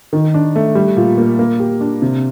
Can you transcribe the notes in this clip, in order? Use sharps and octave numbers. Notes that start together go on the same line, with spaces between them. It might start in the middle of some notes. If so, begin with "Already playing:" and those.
D#3
D4
A3
G3
A#2
A#3
A#3
G4
D4
C3